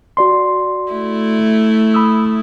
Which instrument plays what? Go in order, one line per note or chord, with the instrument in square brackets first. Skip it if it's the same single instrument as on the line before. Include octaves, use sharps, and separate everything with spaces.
[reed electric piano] F#4 D5 C6
[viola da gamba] A3 E4
[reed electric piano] B5 D#6 E6